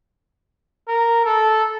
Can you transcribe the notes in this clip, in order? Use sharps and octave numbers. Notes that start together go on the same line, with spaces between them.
A#4
A4